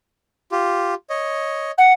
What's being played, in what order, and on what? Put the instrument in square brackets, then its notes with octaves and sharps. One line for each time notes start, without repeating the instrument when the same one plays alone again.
[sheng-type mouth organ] F4 G4
C#5 D#5
[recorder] F#5